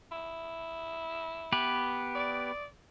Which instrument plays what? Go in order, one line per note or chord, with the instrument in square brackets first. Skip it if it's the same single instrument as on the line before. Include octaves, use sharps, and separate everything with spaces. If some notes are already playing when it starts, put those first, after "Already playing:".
[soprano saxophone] E4
[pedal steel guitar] B3 G4 B4
[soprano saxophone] D5